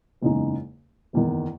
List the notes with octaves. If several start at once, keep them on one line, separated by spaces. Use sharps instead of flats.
F#1 E2 C#3 G#3 D#4
F#1 E2 D#3